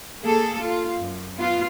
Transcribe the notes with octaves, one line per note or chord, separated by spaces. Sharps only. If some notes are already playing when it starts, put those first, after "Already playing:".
A#3 G#4 A4
F4
F#2
B3 F4